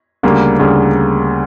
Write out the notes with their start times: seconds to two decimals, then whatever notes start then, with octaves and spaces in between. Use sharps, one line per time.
0.23 D2 C#3 G3 A#3
0.59 D2 C#3 G3 A#3